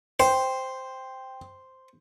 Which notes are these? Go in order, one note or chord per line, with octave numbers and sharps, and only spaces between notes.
C5 G5